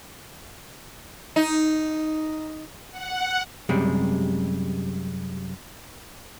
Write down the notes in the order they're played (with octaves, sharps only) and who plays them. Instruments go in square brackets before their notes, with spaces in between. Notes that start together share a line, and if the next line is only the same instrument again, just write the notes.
[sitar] D#4
[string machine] F#5
[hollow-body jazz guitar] F#2 C3 G3 G#3